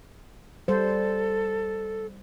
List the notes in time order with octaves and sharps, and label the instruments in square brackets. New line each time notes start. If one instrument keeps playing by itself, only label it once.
[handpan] G3 C5 [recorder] A4